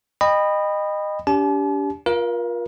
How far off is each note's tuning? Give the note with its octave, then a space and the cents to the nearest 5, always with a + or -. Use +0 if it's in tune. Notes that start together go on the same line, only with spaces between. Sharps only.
D#5 -20 G5 +25 B5 +0
D4 -40 G4 +0 A5 -45
F4 +15 A#4 +35 F5 -30